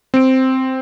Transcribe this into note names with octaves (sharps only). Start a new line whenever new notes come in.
C4 D7